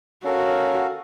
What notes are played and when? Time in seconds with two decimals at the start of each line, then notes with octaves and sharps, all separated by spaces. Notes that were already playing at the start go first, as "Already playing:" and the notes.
0.25 C#4 F#4 A4 A#4 F5